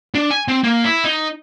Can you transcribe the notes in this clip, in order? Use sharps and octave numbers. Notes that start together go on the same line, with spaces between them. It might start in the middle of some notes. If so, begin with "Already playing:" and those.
D4
G#5
C4
A#3
E4
D#4